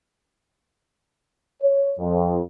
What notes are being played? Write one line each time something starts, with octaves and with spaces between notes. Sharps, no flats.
C#5
F2